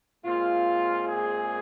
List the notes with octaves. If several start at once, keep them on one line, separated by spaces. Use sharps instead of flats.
A#2 G#3 C4 F4
G#4